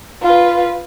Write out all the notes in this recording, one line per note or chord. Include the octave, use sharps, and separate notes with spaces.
F4 B4